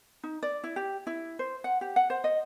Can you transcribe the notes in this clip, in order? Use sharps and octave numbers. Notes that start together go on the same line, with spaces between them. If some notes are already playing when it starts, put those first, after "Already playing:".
D#4
D5
E4
G4
E4
C5
F#5
G4
F#5
C5
D#5